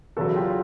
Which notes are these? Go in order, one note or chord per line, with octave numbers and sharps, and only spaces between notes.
E2 C#3 F#3 A4 B4
F4 G4